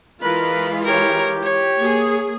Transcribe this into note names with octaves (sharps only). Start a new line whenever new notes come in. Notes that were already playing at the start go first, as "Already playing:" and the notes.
E3 G#3 F4 A#4 B4 B5
G4 A#4 C#5
C#5
A#3 G#4